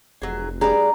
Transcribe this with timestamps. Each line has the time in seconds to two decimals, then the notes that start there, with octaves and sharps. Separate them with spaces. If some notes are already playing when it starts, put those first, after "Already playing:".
0.22 F1 F#3 G#4
0.61 G3 B3 D4 G#4 D5 A#5